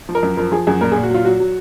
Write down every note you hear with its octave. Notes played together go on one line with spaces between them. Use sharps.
F3
A#4
F#2
F3 A#4
F3 G#4
F#2 G#4
A#2 A#4
A#2 G#4
F#4
F#3 F4
F#3 F#4
F#3